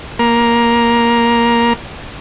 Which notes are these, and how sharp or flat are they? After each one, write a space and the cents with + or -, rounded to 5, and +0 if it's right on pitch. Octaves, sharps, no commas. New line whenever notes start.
A#3 +10